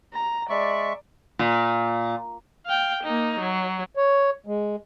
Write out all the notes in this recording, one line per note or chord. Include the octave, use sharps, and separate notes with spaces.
A#5
G#3 D5 E5 C#6
A#2
F5 G5
A#3 D#4
F#3
C#5
G#3